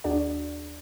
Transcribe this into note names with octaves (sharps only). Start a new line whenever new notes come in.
D#2 D4 F#4 G#4 D5